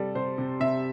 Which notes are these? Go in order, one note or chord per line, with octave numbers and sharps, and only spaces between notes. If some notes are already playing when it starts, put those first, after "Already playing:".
Already playing: C3 G3 A4
C3 C5
C3
C3 E5